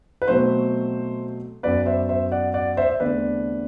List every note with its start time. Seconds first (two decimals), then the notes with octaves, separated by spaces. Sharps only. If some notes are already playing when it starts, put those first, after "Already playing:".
0.22 B4
0.28 B2 F#3 A3 C4 C5
1.63 F#2 F#3 B3 B4 D5
1.86 C5 E5
2.09 C5 E5
2.32 D5 F#5
2.54 D5 F#5
2.77 C5 E5
2.90 E5
3.00 E2 D3 A3 C4 B4 D5